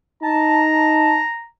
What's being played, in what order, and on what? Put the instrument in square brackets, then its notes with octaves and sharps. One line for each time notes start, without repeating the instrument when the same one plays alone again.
[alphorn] D#4 [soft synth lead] A5 [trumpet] A#5